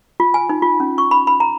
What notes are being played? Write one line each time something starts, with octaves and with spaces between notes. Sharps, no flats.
F4
G#5
D#4
F4
C#4
C#6
B5
B5
A#5